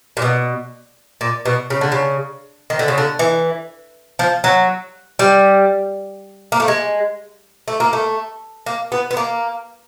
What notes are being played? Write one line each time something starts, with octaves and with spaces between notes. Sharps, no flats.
A#2
B2
A#2
B2
C#3
D3
C#3
D#3
D3
C#3
D3
E3
F3
F#3
G3
A#3
A3
G#3
A3
A#3
A3
A#3
B3
B3
A#3